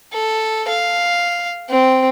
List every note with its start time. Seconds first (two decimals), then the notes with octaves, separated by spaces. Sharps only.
0.13 A4
0.68 F5
1.70 C4